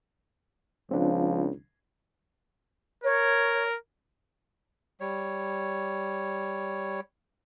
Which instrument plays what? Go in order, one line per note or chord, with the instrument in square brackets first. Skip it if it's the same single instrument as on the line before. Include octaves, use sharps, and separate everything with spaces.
[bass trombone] C#2 [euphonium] F3 [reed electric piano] C4 D4
[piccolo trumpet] A#4 [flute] C#5
[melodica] G3 C#5